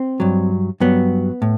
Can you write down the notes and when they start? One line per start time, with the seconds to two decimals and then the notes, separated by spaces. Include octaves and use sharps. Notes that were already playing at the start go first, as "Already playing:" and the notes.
Already playing: C4
0.20 G2 F#3
0.80 G2 F#3 B3
1.42 A2